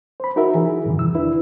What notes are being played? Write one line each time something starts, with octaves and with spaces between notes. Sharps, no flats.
C5 B5
D#4 F#4 A#4 E5
E3 G#4
E2 G2 C3 D#3 E3
E6
D4 E4 B4